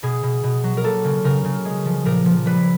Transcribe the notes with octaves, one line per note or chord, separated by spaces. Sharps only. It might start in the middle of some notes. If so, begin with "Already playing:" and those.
B2 G#4
B2
B2
F#3
A#4
A#3 A4
C#3
C#3 A#4
C#3
G#3
F3
A#2 A#4
F3
G3 B4